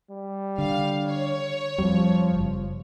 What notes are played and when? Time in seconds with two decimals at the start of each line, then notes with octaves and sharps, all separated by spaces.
0.11 G3
0.58 D3 F5
1.07 C#5
1.78 F2 F3 G3
2.35 F#1